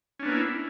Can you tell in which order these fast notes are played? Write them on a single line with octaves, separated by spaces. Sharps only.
C#4 D4 B3 A#3 E4